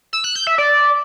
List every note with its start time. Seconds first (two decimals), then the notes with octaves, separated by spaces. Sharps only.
0.13 E6
0.24 F#6
0.35 G6
0.47 E5
0.58 D5